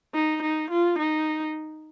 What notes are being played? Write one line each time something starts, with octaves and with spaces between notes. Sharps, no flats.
D#4
D#4
F4
D#4